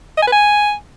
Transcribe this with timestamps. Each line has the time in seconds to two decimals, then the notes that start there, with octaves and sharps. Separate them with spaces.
0.17 D#5
0.22 G#5
0.27 B4
0.32 G#5